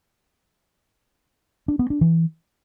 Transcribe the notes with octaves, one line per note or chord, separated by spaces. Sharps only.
D4
B3
D4
E3